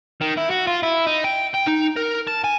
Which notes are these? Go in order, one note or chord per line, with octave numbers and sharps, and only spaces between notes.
D#3
E4
F#4
F4
E4
D#4
G5
G5
D#4
A#4
A5
G#5